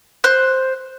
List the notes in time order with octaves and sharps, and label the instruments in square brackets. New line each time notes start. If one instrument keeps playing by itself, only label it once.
[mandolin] C5 F#6